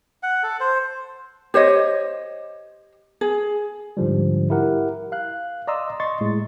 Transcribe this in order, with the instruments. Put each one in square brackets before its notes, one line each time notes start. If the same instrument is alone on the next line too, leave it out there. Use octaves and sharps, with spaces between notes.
[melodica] F#5
A4
C5
[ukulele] G4 C5 C#5 D#5
G#4
[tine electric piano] G#2 D3 F3 G3
E4 G4 A#4 F#5
F5 F#6
D5 D#5 A#5 C6 D#6 E6
D#5 C6 C#6 A6
A2 G#3